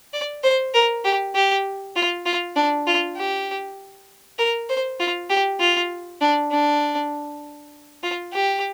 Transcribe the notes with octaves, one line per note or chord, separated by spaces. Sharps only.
D5
C5
A#4
G4
G4
F4
F4
D4
F4
G4
A#4
C5
F4
G4
F4
D4
D4
F4
G4